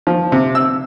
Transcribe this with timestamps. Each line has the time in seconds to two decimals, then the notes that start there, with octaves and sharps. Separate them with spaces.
0.07 F3
0.32 C3
0.55 E6